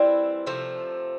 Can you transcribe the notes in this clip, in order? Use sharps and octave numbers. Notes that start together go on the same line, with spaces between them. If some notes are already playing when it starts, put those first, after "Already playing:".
Already playing: E3 G3 C4 E4
C3 F3 A3